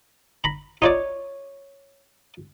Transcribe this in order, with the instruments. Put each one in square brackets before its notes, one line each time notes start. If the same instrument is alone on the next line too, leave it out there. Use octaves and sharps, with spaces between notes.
[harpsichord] A#5 B5
[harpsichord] D#4 F4 D5 [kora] C#5